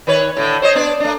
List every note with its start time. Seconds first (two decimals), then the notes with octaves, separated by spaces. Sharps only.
0.07 D#3 B4 C#5
0.37 A2 D3
0.62 C5 C#5 D#5
0.75 B3 D4 D5
1.00 A3 D4